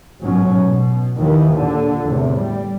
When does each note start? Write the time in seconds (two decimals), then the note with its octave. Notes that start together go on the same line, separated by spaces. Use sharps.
0.22 A1 G#2 B2 F#3 C#4
0.67 B2
1.20 D#2 D#3 E3
1.55 A#2 D3
2.07 E2 A2 C3
2.41 G3